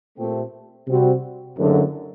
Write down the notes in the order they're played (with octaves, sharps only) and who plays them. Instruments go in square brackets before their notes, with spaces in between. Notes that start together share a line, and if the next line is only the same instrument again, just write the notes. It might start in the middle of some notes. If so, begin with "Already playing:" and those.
[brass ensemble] A#2 A3 C4 G4
C3 G3 C4 F#4
F#1 F#2 D3 A3